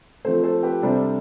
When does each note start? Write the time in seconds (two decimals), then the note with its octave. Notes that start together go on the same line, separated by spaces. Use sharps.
0.25 F3 A3 C4 A4 C5
0.43 A4 C5
0.63 G4 B4
0.82 C3 G3 D4 A4 C5